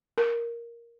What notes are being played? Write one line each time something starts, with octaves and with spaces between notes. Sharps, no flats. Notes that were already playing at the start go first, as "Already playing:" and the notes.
A#4